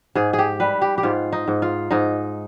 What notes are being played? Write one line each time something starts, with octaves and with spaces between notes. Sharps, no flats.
G#2 G#4
G#4
G4
G3 B4
G4
G4
G#2 F4
D#4
G#2
F4
G#2 D#4